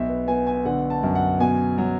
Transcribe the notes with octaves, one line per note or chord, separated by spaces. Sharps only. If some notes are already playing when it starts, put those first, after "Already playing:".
Already playing: B1 E5
B4
B3 G#5
G#5
D3 F#5
A5
F#2
F#5
B2 G#5
F#3